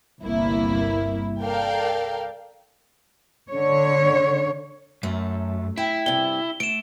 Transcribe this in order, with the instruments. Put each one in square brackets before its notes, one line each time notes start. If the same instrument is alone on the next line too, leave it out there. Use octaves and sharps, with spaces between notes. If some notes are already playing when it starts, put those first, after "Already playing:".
[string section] G1 C2 A#3 E4
A4 A#4 D5 F5 G5
[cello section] D3 C#5
[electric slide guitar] F#2 [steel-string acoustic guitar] A3
[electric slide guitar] E4 [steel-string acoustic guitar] G5
[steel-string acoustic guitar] G2 C3 [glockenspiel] G7
[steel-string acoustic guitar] A3 [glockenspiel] D7 E7